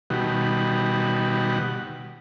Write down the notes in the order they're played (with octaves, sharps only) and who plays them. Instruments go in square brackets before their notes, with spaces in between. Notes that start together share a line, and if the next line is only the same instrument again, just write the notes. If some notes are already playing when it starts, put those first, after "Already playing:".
[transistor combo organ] B2 D#3 G3 F#4